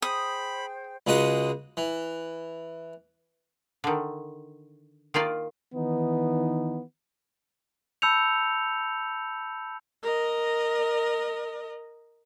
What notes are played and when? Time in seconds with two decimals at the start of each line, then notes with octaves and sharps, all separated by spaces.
0.02 G#4 C5 G5 B5 D#6
1.07 C#2 C#3 G#3 F#4 D#5 D#6
1.77 E3
3.84 D3 D#3
5.14 D#3 A#3 F4 D5
5.75 D#3 E3 B3 D#4
8.02 A5 B5 E6 G6 C#7 F7
10.03 A#4 D#5